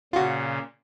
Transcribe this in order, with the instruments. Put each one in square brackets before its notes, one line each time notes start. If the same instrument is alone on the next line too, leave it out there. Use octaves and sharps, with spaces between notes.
[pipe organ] A#2 C#3 [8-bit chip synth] F4 F#4